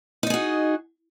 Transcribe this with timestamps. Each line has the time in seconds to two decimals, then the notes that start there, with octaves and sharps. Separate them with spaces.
0.23 D#4
0.27 D#5
0.30 G#4
0.34 F#4